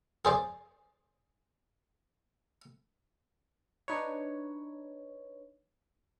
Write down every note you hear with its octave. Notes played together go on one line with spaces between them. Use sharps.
G#4 C5 D5
D4 D#4 B4 C#5